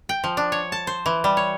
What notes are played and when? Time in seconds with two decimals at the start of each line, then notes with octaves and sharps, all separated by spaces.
0.09 G5
0.24 F3
0.37 D4
0.52 C#5
0.72 A5
0.87 C5
1.06 E3
1.24 G3
1.37 C#5